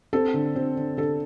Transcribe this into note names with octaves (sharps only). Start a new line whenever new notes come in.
C4 A4
D3
C4
D3
D3 A4